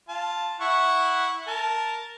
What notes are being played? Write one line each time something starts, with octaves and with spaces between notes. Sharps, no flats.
F4 A5
E4 F#5 C#6
A#4 A5